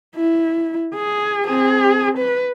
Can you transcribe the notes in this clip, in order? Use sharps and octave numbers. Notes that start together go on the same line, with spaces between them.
E4
G#4
C4 G#4
B4